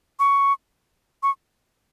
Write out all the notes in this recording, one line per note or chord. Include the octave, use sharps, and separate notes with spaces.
C#6
C#6